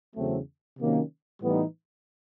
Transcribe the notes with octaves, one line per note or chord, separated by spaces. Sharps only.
E2 C#3 F#3 A3 C4
C3 D#3 F#3 A#3 C#4
A2 E3 G3 B3 D#4